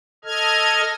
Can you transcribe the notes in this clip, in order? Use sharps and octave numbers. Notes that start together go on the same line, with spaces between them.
A4 D#5 F6 G#6